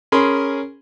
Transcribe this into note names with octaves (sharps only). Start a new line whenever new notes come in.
C#4 G#4 A#4 B5 C6